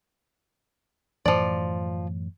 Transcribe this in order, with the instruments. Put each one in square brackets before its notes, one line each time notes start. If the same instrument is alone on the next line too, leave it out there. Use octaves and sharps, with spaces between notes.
[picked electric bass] F#2 A2 E3 [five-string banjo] F3 D5